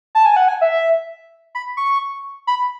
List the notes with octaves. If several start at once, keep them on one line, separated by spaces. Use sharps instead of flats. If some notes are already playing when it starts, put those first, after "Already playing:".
A5
G#5
F#5
G#5
E5
B5
C#6
B5